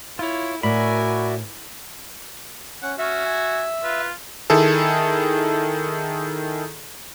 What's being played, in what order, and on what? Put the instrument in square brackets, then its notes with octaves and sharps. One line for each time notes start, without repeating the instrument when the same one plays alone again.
[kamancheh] E4 [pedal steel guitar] F4 C#5
[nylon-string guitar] A2 [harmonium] F#4 D5 E5 [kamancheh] A#4 G#5 [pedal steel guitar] B5
[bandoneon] C#4 [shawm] F#5
[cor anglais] C#4 [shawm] F#4 [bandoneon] E5
[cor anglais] G#5
[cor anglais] F4 [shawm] B4
[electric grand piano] D#3 E4 G#4 A4